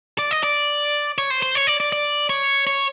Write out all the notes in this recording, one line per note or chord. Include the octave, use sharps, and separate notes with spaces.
D5
D#5
D5
C#5
C5
C5
C#5
D5
D5
D5
C#5
C#5